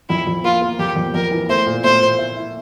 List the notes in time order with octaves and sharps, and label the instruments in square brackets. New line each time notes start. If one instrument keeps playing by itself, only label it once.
[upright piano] F2 [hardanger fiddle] E4
[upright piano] F2
[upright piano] A#3 [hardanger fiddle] F4
[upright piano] A#3
[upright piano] F2 [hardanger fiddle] G4
[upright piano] F2
[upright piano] F2 [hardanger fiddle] A#4
[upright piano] E3
[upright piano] A3 [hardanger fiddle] C5
[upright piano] A#2
[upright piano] A3 [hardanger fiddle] C5
[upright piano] A#2
E4
E4